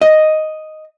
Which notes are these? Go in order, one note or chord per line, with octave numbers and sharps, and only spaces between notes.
D#5